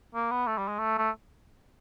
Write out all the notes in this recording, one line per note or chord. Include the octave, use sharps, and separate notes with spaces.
A#3
B3
A3
G3
G#3
A3
A3